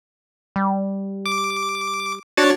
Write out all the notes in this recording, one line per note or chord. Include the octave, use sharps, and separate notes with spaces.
G3
D6
D4 F#4 C#5 A6